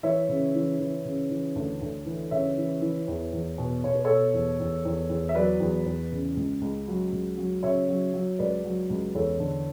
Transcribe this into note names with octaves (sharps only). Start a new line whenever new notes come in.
E3 C#5 E5
C#3
E3
E3
C#3
E3
D2
D2
E3
C#3 C#5 E5
E3
E3
E2
E2
B2
B2 C#5
B4
B2 A4 C#5
E2
E2
E2
E2
E5
F#3 B4 D5
E2
E2
C#3
C#2
C#2
F#3
C#2
F#3
C#3 C#5 E5
F#3
F#3
C#2 B4 D5
F#3
C#2
E2 A4 C#5
D3